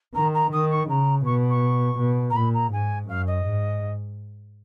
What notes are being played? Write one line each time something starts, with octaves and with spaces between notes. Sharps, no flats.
D#3 A#5
A#5
D#3 D#6
C#6
C#3 A#5
B2 C#6
C#6
B2
A#5
A#2 B5
A#5
G#2 G#5
F#2 F5
D#5
G#2